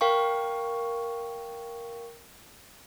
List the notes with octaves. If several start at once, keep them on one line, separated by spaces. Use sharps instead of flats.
A#4 F5 G5 C#6